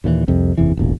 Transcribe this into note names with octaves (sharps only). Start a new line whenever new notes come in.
D#2 A#2 C#3 E3
C2 F2 C3
F#1 E2 C3 E3
E1 A1 A#2